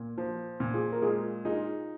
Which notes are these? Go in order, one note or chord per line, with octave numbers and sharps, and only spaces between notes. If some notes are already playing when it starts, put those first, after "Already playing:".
Already playing: A#2 A#3
F3 F4
A#2
F4 G#4
A#4
G#3 F4 G#4
D#4 F4 G#4